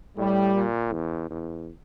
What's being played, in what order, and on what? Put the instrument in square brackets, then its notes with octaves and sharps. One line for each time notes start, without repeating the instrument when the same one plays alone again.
[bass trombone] A2 [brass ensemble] G3
[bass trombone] A#2
E2
E2